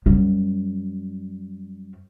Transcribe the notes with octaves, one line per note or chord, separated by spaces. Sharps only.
F#2 G3